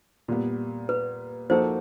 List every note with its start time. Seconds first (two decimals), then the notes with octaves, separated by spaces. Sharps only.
0.28 A#2 G3 B3
0.89 B4
1.50 F3 A#3 D#4 F#4 A4 C5